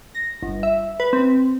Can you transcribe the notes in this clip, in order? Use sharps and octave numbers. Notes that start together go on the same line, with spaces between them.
A#6
G1
E5
B4
C4